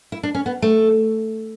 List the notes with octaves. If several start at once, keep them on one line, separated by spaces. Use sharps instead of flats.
E4
D4
C#4
B3
A3